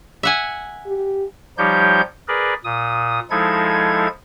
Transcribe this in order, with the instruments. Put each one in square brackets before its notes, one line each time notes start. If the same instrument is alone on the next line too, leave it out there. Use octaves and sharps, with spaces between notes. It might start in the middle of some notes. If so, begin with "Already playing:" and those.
[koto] E5 F#5 G#5
[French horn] G4
[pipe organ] F3 G3 D#4 G4 C#5 G6
G#4 A#4 B4 D5
A#2 D#6
F3 G#3 D#4 E4 A4 G#6